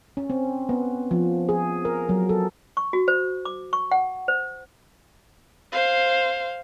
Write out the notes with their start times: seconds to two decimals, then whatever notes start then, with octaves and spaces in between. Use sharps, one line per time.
0.17 C#4
0.30 C4
0.69 B3
1.11 F3
1.49 G#4
1.85 A#4
2.09 F#3
2.29 A4
2.77 C#6
2.93 F#4
3.08 C5
3.45 D6
3.73 C#6
3.91 F#5
4.28 C5
5.72 C5 F5